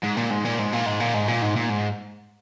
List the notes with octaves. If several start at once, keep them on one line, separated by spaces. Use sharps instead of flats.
G#2
A#2
G#2
A#2
G#2
A#2
G#2
A#2
G#2
A#2
G#2
A#2
G#2